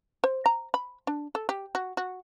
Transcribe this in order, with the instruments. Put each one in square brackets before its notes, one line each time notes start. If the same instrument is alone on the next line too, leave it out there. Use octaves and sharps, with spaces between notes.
[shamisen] C5
A#5
B5
D4
A4
G4
F#4
F#4